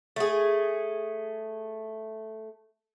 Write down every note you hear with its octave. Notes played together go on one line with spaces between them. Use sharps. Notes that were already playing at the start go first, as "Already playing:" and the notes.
A3 G#4